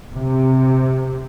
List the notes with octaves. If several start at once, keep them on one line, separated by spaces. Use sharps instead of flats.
C3